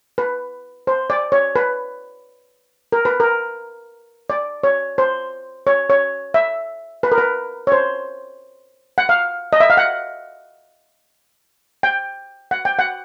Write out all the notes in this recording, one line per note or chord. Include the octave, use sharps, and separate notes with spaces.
B4
C5
D5
C#5
B4
A#4
B4
A#4
D5
C#5
C5
C#5
C#5
E5
B4
A#4
B4
C#5
C5
F#5
F5
D#5
E5
F5
F#5
G5
F#5
G5
F#5